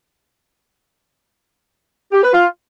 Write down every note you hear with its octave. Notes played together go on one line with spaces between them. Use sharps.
G4
B4
F4